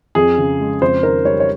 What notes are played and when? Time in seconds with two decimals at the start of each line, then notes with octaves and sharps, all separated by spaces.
0.15 F2 G#4
0.38 C#3
0.60 G#3
0.81 F2 C5
1.03 D#3 A#4
1.25 G3 C#5
1.40 C#5